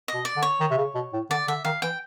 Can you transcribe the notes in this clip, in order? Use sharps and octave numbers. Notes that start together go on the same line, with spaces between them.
D#5
B2
D5
D3
C#5
D#3
C3
C#3
B2
A2
D3 D5
D3 E5
D#3 F5
E3 G5